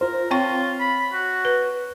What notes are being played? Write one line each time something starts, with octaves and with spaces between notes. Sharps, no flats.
F4 A#4 C5
C4 F4 C#5 G5 C#6
B5
F#4
B4